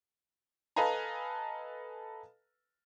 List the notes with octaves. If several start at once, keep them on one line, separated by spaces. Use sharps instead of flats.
A4 B4 D#5 F5 G#5 A#5